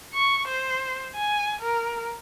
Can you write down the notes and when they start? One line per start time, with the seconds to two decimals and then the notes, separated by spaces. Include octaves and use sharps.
0.14 C#6
0.48 C5
1.15 G#5
1.61 A#4